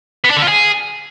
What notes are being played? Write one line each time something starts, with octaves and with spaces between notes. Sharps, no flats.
B3
D4
D3
F4
G#4